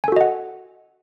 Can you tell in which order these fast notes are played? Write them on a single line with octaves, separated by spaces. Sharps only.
G#5 A4 F#4 D#5 F#5